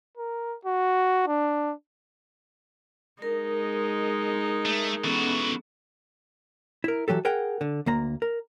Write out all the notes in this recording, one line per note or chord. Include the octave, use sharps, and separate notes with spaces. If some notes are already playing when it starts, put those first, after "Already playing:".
A#4
F#4
D4
G#3 D#4 A#4
A3
E3 B3 C#4 F#4 A4
E4 A#4
E3 F#3 G4 A4
G#4 A#4 F#5 G5
D3
D2 A#3 A#5
A#4